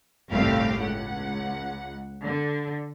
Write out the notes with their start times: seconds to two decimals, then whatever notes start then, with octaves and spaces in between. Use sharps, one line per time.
0.31 G1 C2 A2 A3 G4 F5
0.80 C#2 F#5
2.23 D3